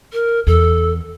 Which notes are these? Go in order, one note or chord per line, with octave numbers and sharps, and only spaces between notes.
A#4
E2 A4